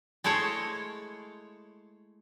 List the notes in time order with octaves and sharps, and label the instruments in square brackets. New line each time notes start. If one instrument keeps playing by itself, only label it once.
[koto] G#3 A3 E4 C5 C#5